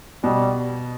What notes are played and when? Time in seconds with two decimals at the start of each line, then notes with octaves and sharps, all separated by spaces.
0.24 B2 G3